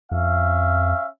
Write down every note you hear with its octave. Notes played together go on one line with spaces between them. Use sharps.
F2 C#4 E5 F5